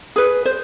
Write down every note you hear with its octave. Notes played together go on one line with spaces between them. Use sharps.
G#4 B4
C5